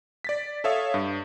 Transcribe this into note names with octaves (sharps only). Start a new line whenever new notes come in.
D5 A6 B6
A4 C#5 E5 F5 D#6
G2